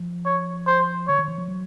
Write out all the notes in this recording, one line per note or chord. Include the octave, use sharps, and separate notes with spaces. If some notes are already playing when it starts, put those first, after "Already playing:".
Already playing: F3
C#5
C5
D3 C#5
D#3
E3
F3
F#3